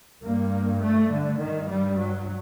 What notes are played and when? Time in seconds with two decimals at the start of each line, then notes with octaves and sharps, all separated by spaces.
0.23 G2 A#3
0.81 A3
1.11 D3
1.39 G2 D#3
1.69 G3
1.98 F#3